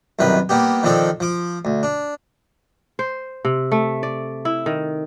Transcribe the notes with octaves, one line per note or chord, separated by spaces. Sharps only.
C2 F#2 D#3 B4
G3 A#3 B3 G4
D#3 F3 C4 D4 A4
F3 D6
D2
D4
C5
C3
A3
D5
E4
D#3